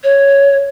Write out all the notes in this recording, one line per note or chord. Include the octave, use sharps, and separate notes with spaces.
C#5